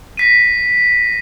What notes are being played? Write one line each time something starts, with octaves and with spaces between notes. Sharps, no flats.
A#6 B6 D#7